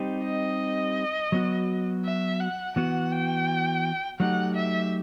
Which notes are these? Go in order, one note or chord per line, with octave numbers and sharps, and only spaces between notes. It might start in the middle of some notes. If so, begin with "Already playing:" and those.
Already playing: G3 C4 D#4 G4
D#5
F#3 B3 F#4
E5
F#5
E3 B3 F#4 F#5
G5
F#3 A3 D#4 G4 F#5
E5